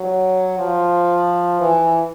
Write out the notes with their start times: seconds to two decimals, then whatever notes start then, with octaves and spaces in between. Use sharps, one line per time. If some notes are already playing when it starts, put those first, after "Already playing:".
Already playing: F#3
0.58 F3
1.61 E3